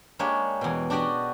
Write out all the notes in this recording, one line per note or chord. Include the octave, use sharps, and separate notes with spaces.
G#3 A#3 D4 G4 C#5
E2 B2
D4 F#4 G4 D5 D#5